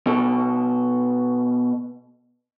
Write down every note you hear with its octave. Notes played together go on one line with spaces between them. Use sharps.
B2 A4